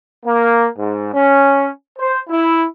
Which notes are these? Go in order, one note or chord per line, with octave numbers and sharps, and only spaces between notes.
A#3
G#2
C#4
C5
E4